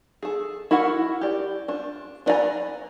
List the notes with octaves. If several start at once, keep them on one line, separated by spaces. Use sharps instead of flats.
G#4 A4
E4 F#4 A#4 F#5
G4 D5
D4 F4
D4 B4 D5 G#5 A#5